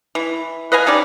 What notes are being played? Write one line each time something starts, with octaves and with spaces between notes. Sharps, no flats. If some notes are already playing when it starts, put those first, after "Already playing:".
E3
B4 D#5 F5 G#5
C#4 D#4 G4 D5